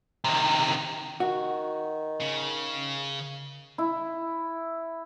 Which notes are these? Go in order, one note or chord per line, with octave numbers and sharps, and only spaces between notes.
C3 D#3
D#3 F#4
C#3
E4